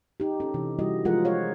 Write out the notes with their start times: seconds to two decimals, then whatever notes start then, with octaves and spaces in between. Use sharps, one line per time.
0.20 D#4 G4
0.40 C#4 G4 A4
0.54 C3 E3
0.79 E3 G3 E4 F#4 D#5
1.05 F3 G#3 F4 G#4 A#4 F#5
1.25 G#4 C#5 F5